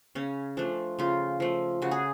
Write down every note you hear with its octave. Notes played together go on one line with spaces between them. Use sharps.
C#3 C#4
F3 A3 D4
C#3 F4
F3 A3
C#3 F#4
G#4